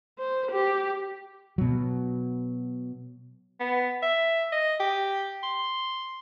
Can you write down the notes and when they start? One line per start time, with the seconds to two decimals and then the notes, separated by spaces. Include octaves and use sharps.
0.19 C5
0.51 G4
1.58 B2 F#3
3.60 B3
4.02 E5
4.52 D#5
4.80 G4
5.43 C6